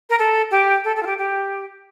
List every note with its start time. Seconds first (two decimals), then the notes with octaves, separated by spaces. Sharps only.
0.09 A#4
0.18 A4
0.50 G4
0.84 A4
0.96 A4
1.02 F4
1.06 G4
1.18 G4